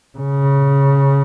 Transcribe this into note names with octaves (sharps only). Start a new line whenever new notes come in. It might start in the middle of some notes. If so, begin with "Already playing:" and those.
C#3